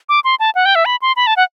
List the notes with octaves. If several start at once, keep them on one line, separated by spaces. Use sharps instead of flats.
D6
C6
A5
F#5
G5
E5
B5
C6
B5
A5
F#5